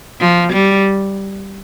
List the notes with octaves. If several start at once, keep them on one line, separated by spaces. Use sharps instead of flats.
F3
G3